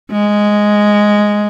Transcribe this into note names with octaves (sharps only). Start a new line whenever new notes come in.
G#3